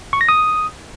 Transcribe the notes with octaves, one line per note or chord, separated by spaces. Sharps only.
C#6
A#6
D#6